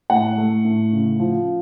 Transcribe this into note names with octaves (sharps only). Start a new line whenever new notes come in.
A2 F#5
A3
A2
C#3
F3